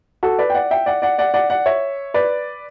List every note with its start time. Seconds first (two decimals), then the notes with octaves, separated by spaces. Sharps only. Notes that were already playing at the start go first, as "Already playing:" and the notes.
0.23 F#4 A4
0.39 B4 D5
0.50 G5
0.54 D5 F#5
0.71 E5 G5
0.86 D5 F#5
1.02 D5 F#5
1.18 D5 F#5
1.34 D5 F#5
1.50 D5 F#5
1.66 C#5 E5
2.14 B4 D5